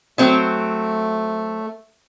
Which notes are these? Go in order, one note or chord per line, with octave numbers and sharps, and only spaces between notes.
F#3 A3 C4